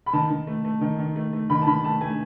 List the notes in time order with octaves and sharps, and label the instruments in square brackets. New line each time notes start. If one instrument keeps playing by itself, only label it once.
[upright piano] B5
D#3 A5
D#3
A3
A3
D#3
D#3
A3
A3
D#3 B5
A5
D#3 B5
A3 A5
A3 G#5